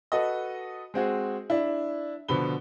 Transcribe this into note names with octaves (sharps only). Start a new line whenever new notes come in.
F#4 A4 B4 D#5
G#3 C4 F#4 G#4
D4 E4
B2 D3 F3 B5 G7